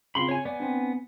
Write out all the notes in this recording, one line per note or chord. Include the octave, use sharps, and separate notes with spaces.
C#3 C4 F4 B5 C6
C#5 G#5
B3 D5 G#5
C4 D4